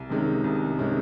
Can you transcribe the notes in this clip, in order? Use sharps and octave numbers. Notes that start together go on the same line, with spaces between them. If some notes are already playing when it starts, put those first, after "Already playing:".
Already playing: C2
C3 D#3 G#3 C#4
C2
C3 D#3 G#3 C#4